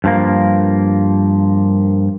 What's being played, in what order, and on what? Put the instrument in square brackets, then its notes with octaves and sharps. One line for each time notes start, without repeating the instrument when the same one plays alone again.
[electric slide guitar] G2 F3 A#3